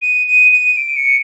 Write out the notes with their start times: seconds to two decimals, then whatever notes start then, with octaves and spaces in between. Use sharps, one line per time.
0.02 D#7
0.27 D#7
0.52 D#7
0.77 D7
0.96 C#7